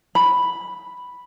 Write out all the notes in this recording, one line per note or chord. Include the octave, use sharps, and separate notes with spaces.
B5